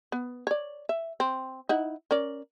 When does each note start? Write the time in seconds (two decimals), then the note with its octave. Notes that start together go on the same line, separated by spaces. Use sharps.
0.12 B3
0.47 C#5 D5
0.89 E5
1.20 C4
1.69 D#4 E4 F#5
2.11 C#4 A#4 D5